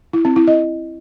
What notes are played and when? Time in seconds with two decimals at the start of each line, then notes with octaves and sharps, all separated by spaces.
0.13 E4
0.25 C4
0.36 E4
0.47 D#5